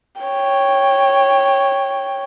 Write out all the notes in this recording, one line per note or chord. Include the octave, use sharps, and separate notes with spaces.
C#5 G5